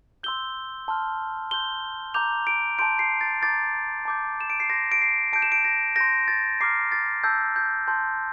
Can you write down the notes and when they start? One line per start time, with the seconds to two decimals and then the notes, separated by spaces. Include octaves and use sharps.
0.23 C6 E6 G6 G7
0.88 A5 C6 F6
1.51 C6 G6 G7
2.14 A#5 D6 G6 F7
2.47 D7
2.79 A5 C6 G6 D7
2.99 C7
3.21 A6
3.41 A#5 D6 G6 A6
4.05 A5 D6 G6
4.41 E7
4.50 D7
4.60 C7
4.70 C6 G6 A#6
4.92 D7
5.02 C7
5.33 A5 D6 G6 D7
5.42 E7
5.52 D7
5.65 A#6
5.96 C6 G6 A#6
6.28 A6
6.61 A#5 D6 F6 C7
6.92 A6
7.23 A5 E6 G6
7.56 G6
7.87 A5 C6 G6